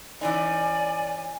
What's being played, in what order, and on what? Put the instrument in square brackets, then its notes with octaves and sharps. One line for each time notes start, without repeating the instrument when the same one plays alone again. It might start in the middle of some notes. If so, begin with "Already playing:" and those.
[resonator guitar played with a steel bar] E3 C#4 D#4 [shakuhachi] D5 [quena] G#5